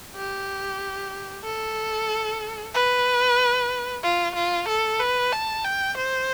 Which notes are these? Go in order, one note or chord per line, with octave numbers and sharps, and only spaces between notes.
G4
A4
B4
F4
F4
A4
B4
A5
G5
C5